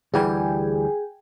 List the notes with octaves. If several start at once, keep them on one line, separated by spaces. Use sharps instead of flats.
D2 E3 G3 G#4 G5 G#5